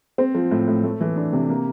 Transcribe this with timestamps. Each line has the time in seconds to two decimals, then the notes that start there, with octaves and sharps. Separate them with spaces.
0.18 C4
0.35 F3
0.51 A2
0.68 A2
0.83 A3
1.01 E3
1.16 D4
1.33 C3
1.49 A#3